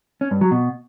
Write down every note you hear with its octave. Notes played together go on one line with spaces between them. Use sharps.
C#4
G2
F#3
B2